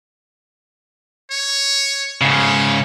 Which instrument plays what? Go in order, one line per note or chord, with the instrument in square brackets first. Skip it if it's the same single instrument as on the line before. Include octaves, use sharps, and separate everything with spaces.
[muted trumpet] C#5
[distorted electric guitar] G#2 C#3 [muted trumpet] C#5